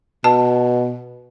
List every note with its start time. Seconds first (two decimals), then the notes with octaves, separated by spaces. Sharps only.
0.24 B2 A5